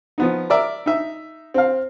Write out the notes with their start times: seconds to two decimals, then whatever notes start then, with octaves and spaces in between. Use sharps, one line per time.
0.18 F3 B3 D#4
0.50 A#4 D5 E5
0.86 D#4 E5
1.54 C4 F5